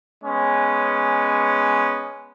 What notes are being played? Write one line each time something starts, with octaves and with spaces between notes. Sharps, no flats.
G#3 B3 C#4